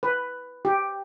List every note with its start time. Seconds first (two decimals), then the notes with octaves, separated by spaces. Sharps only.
0.03 B4
0.65 G4